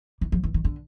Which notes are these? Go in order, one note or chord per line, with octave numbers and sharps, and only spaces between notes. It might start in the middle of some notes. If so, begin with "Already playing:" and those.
E3
F3
E3
D#3
D3